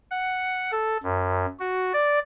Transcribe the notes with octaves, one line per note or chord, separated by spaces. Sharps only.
F#5
A4
F#2
F#4
D5